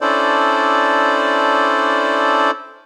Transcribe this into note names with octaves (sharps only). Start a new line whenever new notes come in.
C#4 D4 E4 A4 C5 D5